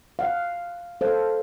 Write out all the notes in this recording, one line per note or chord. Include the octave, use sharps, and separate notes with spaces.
F5 F#5
A4 C5 F5